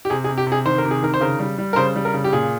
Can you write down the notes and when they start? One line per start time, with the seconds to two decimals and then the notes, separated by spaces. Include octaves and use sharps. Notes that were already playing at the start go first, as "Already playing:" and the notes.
0.05 G4
0.10 C3 G#4
0.24 G#4
0.29 C3
0.37 G4
0.46 C3
0.52 G#4
0.66 D#3 C5
0.78 A#4
0.85 C3
0.91 G#4
1.02 D#3 A#4
1.14 C5
1.21 C#3 A#4
1.39 G3
1.58 G3
1.73 A#4
1.76 C#3 C5
1.96 G3
2.05 A#4
2.14 C#3
2.24 G4
2.33 A#2 G#4